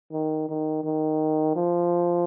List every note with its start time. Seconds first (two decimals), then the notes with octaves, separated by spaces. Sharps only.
0.12 D#3
0.49 D#3
0.84 D#3
1.56 F3